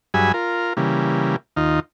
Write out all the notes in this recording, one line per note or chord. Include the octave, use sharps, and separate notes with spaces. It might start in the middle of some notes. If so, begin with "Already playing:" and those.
G2 F#3 G#4 E5 G#5 B5
F4 A#4
C#3 E3 G3 A#3
D#2 D#4 F4